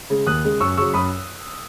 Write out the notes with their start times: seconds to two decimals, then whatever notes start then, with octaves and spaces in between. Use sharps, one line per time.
0.10 C#3 G#3
0.26 D#2 D#6 F#6
0.44 C#3 G#3
0.60 F#2 C#6 E6
0.77 C#3 F#3 C#6 E6
0.94 F#2 B5 D#6